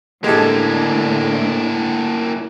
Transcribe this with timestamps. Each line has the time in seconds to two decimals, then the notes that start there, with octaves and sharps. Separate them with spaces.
0.24 A2 D3 G#3 A#3 E4 G4 A4